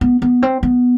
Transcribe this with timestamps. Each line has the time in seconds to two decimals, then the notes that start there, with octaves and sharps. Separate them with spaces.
0.01 B3
0.22 B3
0.42 C4
0.63 B3